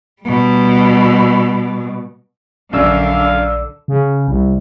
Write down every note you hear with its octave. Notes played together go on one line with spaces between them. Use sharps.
B2 G3
A#1 F#2 D3 D5 F5 E6
C#3
C2